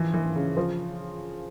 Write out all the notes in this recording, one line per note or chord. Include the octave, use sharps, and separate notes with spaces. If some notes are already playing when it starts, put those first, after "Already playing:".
Already playing: E3 F3
E3
C#3
F3